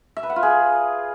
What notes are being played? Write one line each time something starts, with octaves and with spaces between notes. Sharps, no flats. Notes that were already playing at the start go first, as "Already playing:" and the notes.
E5
B4
F#5
F4
G#4